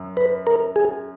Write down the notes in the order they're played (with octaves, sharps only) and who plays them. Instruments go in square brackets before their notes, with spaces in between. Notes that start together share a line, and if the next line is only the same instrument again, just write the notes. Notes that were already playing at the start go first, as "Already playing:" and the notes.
Already playing: [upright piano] F#2
[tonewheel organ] B4
A#4
G#4